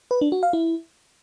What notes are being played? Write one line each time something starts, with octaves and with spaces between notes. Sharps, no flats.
B4
D4
F#4
F5
E4